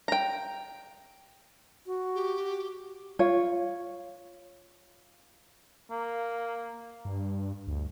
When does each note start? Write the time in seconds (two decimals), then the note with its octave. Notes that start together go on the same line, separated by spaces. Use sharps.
0.08 G5 A#5
1.85 F#4
2.15 G4
3.19 F4 C#5
5.91 A#3
7.05 G2
7.67 D2